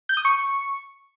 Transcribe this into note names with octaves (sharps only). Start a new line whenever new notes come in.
G6
D#6
C#6